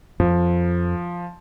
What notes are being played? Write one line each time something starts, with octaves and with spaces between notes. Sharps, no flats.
F2 F3